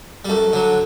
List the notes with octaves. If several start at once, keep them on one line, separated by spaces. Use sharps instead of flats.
G3
F#2 A3
D3 F#3